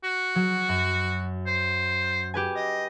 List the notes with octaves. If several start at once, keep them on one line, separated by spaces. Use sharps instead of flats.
F#4
F#3
F#2
C5
G4 B4 G#5
D#5